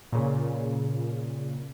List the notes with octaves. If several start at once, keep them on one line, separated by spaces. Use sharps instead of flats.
A#2 C#3